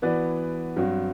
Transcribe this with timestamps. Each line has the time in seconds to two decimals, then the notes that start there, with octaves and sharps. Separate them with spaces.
0.02 E3 B3 F#4 B4 D5
0.76 G2 F#3 C4 F#4